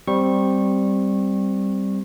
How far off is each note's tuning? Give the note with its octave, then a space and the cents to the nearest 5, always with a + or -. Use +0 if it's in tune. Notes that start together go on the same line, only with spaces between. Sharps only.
G3 +0 C4 +0 C#6 -20